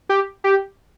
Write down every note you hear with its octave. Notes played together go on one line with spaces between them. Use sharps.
G4
G4